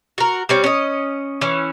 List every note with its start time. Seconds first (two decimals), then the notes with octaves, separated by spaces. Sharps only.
0.18 F#4 A#4
0.49 G3 C4 C#4
0.64 C#4 D#5
1.41 E3 C#4